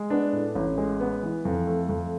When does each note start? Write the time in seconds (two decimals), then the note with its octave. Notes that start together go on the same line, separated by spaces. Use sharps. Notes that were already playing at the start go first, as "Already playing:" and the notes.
Already playing: G#3
0.10 B3 D4
0.33 A2
0.55 A1
0.78 G#3
1.00 B3
1.23 E3
1.45 F2
1.67 A3
1.89 F2